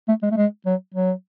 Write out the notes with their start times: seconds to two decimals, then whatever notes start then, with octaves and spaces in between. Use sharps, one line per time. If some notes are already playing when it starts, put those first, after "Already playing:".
0.08 A3
0.22 G#3
0.31 A3
0.37 G#3
0.66 F#3
0.94 F#3